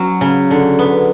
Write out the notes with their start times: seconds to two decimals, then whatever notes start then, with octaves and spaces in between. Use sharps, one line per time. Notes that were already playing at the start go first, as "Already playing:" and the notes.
Already playing: F#3 C#4
0.21 C#3
0.50 D3
0.79 B3